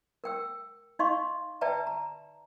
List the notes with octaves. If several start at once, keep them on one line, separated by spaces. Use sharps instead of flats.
A#4 G5 E6
D#4 D#5 F5 C6 C#6
B4 D5 E5 G5 A5 A#5
A#5